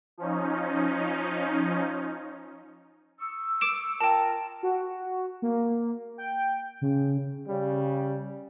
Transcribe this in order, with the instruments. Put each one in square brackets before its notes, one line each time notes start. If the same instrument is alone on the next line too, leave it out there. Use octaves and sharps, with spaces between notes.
[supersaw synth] F3 C#4 D#4
[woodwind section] C#6 D#6 E6
[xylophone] D6 D7 E7
[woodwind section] F4 A#4 [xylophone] G5 A5
[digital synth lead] F#4
A#3
G5
C#3
[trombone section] C#3 G3